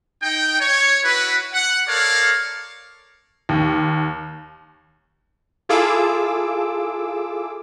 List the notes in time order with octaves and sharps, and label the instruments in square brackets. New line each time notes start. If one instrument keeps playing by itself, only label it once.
[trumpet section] D#4 G5
C#5
E4 F#4 B4
F#5
A4 A#4 C#5 D5 F5
[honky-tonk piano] D#2
[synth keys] E4 F4 G#4 A4 D6 E6